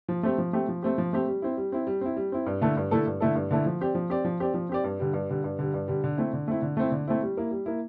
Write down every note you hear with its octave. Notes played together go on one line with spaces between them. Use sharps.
F3
A3 C4 G4
F3
A3 C4 G4
F3
A3 C4 G4
F3
A3 C4 G4
G3
C4 E4
G3
C4 E4
G3
C4 E4
G3
C4 E4
G2
D3 A3 E4 A4
G2
D3 A3 E4 A4
G2
D3 A3 E4 A4
G2
D3 A3 E4 A4
F3
C4 G4 D5
F3
C4 G4 D5
F3
C4 G4 D5
F3
C4 G4 D5
G2
D3 G3
G2
D3 G3
G2
D3 G3
G2
D3 G3
D3
A3 C4 E4
D3
A3 C4 E4
D3
A3 C4 E4
D3
A3 C4 E4
G3
A#3 E4
G3
A#3 E4